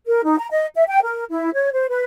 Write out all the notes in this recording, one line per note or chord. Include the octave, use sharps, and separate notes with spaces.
A#4
D#4
A#5
D#5
E5
G5
A#4
E4
C#5
C5
B4